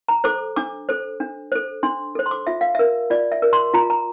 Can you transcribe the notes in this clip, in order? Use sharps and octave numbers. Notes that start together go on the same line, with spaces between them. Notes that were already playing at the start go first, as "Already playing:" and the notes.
A#5
A4 C5 D6
D4 D6
A4 C5
D4
A4 C5
D4 C6
A4 C5
C6
D6
F4 E5
F5
A#4 E5
F4 D5
E5
A#4
C6
F4 A#5
A#5